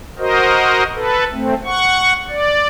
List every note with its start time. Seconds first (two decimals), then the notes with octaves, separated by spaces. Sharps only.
0.19 F#4 A#4 C5 D#5
0.95 A4 B4
1.32 A3 C4
1.65 F#5 C#6
2.29 D5